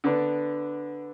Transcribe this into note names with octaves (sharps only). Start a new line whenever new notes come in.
D3 B3 D4